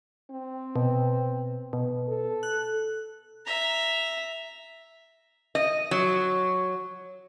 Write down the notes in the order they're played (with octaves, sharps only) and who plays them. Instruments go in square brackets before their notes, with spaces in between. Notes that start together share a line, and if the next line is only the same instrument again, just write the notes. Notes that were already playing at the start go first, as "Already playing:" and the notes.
[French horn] C4
[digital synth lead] B2
B2
[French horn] A4
[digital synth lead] F#6
[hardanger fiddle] E5 A#5
[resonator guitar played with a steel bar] D#5
F#3